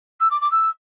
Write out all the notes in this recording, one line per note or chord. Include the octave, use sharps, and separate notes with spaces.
E6
D6
D6
E6